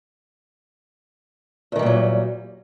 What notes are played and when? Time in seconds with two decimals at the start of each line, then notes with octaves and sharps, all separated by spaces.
1.72 E2
1.76 D#3
1.79 G3
1.83 A#2
1.86 F#3